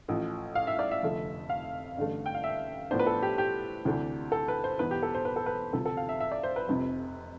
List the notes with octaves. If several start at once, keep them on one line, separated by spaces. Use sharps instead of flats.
A1 A2 F3
F5
E5
D5
E5
F1 F2 D3 A3
F5
A1 G2 D3 A3
G5
F5
E5
A2 F3 B3 D4 C5
B4
A4
G4
G4
D2 C3 E3 A3 D4
A4
B4
C5
E2 B2 B3 E4 B4
G4
A4
C5
B4
A4
B4
D2 C3 F3 A4
A4
F5
E5
E5
D5
C5
B4
F1 F2 C3